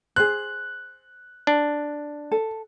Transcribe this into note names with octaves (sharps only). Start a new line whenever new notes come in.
G#4 C5 F#6
D4
A4